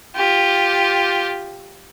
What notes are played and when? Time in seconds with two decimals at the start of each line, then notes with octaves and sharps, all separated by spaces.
0.16 F4 G4